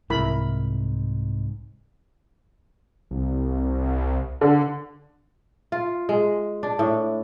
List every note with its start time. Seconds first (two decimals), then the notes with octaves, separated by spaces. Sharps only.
0.10 C2 G#2 E4 A#4 B5
3.11 C2
4.41 D3
5.72 F4
6.09 G#3
6.63 D4
6.79 A2